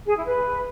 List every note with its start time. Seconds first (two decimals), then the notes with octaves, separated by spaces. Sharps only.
0.06 G#4
0.16 E4
0.25 B4